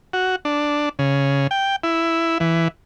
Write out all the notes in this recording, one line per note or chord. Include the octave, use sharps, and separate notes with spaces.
F#4
D4
C#3
G5
E4
E3